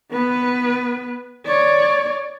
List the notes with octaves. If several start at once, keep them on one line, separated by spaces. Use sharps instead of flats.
B3 B4
C#5 D5